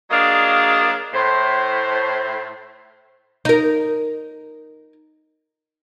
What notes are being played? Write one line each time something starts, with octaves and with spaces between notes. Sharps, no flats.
F#3 A#3 D4 G#4 D#5 F5
A2 C5
D#4 A#4